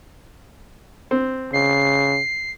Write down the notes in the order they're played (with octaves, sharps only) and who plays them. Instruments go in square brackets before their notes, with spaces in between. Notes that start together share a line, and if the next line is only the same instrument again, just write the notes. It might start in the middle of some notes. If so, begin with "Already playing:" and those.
[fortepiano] C4
[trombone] C#3 [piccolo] C7